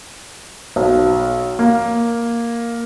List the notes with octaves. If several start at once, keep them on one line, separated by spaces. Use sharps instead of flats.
B1
A#3